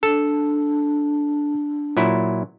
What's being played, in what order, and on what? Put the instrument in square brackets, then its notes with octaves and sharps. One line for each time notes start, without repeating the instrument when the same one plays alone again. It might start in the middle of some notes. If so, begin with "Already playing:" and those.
[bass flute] D4 [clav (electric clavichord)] A4
[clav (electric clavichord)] A#2 F#3 E4